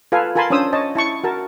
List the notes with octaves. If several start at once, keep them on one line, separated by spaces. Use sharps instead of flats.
F4 A4 B4 F5 G#5
F4 A#4 G#5 A5 B5 C6
C#4 D4 C5 D#6 E6
C#5 D#5 A5
E4 A5 C#6
F#4 A#4 A5